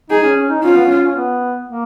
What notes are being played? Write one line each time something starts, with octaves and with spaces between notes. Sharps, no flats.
D#4 G#4
C#4
C#4
D#4
C#4 F4
B3
C#4
C#4
B3
A#3